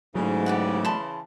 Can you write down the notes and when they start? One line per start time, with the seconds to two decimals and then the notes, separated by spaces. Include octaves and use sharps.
0.15 G#2 C#3 E3 F#3 A3
0.46 G4 D5 F#5
0.85 A5 B5 C6